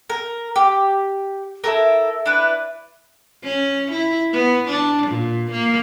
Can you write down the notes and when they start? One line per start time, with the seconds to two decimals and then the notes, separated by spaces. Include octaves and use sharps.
0.10 A#4
0.56 G4
1.64 E4 G4 A4 A#4
2.26 D4 E4 B4
3.44 C#4
3.91 E4
4.33 B3
4.68 D4
5.07 A#2
5.52 A#3